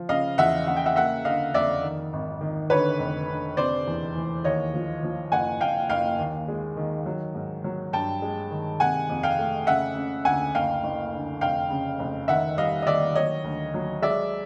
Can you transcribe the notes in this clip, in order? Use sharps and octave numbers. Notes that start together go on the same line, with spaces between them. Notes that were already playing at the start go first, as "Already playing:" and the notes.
Already playing: F3
C#3 D#5 F5
E2 E5 F#5
C#3 F#5
G5
E5 F#5
A#3 E5 F#5
D3 D#5 F5
F2 D5 E5
D#3
G#1
D#3
D3 B4 C#5
F1
D3
C3 C5 D5
E2
E3
D#2 C#5 D#5
F3
F3
F#1 F#5 G#5
F#1 F5 G5
F#1 F5 G5
D#2
G#3
D#3
F#3
G#2
F#3
G2 G5 A5
G#3
D#3
C3 F#5 G#5
F2
F5 G5
A3
C#3 E5 F#5
C#3
D2 F#5 G#5
F#1 F5 G5
F#1
D3
F1 F5 G5
C#3
F1
D#3 E5 F#5
G3 D#5 F5
D#5
D#3 D5 E5
F#3 C#5 D#5
D2
F#3
G#3 D5 E5